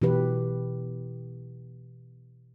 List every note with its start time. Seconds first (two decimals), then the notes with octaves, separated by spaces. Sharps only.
0.02 B2 E3 G4 B4